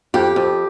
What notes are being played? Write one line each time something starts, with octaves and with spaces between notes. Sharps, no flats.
F2 G4
F2